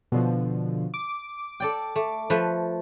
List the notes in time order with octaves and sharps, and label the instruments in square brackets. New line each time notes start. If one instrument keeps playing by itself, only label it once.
[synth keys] B2 D3 F3
D6
[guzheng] A4 D5 G5
A3
F3 A3 B4